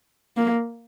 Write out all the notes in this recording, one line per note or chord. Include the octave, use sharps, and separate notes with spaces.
A#3